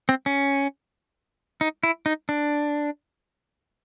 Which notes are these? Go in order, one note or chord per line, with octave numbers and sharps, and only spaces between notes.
C4
C#4
D#4
E4
D#4
D4